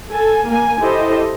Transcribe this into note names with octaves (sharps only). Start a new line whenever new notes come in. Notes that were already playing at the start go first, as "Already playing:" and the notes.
A4 G#5
A#3 G#5
E4 G4 A4 C5 D#5